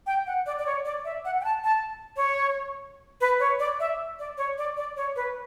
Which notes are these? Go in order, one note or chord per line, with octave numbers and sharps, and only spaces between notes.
G5
F#5
D5
D5
C#5
D5
E5
F#5
G5
A5
A5
C#5
B4
C#5
D5
E5
D5
C#5
D5
D5
C#5
B4